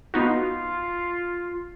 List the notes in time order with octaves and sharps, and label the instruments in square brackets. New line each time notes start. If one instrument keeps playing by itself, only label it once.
[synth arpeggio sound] B3 D#4 F#4 [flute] F4